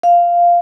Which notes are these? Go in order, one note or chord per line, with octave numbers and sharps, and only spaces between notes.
F5